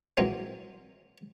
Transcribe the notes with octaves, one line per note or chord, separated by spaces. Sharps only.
A#2 E3 F#3 G#3 C4 C#4